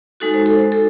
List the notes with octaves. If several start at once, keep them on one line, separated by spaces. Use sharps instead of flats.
G#3 D#4 F#4 A4
C5
A4
C5
A4